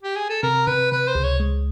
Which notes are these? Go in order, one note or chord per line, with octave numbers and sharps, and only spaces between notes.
G4
G#4
A4
C3 A#4
C3 B4
C3 B4
C5
C#2
C#5
G#3